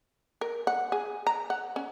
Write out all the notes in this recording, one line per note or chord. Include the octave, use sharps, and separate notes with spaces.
A#4
F#5
G#4
A#5
F#5
C#4